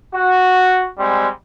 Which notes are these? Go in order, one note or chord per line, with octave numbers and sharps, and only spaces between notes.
F#4
G3 G#3 C4